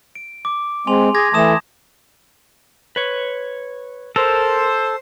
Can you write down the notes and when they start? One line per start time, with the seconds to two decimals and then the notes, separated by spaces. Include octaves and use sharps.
0.15 D7
0.45 D6
0.87 G#3 C4 G#5 C6 F7
1.15 G#4 D6 G#6 A#6
1.33 E3 A3 A5 D#6 E7
2.96 B4 C#5
4.16 A4 A#4 C5